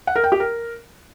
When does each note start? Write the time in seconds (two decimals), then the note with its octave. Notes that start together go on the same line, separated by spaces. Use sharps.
0.07 F#5
0.16 A#4
0.24 G5
0.32 G4
0.40 A#4